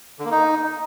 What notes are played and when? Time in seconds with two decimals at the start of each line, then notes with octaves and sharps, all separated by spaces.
0.19 D3
0.25 A#3
0.31 D#4